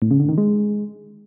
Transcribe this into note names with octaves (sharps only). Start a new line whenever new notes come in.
A2
C#3
D3
D#3
G#3